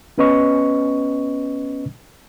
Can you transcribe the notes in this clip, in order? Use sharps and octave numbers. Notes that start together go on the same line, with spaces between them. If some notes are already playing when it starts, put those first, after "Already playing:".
B3 C#4 B4 D#5 C#6